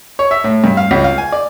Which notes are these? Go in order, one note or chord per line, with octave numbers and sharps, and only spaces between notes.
C#5
E5
A2
G2
F5
C#2
F5
G#5
D5